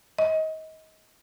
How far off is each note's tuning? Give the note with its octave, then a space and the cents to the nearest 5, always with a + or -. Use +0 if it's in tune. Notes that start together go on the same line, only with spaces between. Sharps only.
D#5 +25